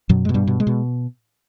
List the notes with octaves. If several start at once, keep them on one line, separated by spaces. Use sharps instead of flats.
F#2 B2 F#3
G#3
B2
G2 G3
B2
G#3
B2